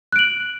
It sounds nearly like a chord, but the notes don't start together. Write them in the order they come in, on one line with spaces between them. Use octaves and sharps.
F#6 D7 F#7